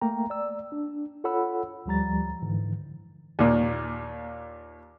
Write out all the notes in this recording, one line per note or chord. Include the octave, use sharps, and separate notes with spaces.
A3 A#3 G5 A#5
D5 E6
D4
F4 A4 C#5 F#5 B5 E6
D2 F3 G3 A#5 A6
G#2 D3 E3
D#2 A#2